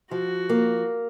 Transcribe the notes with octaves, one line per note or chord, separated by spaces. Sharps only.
F3 F#4
A#3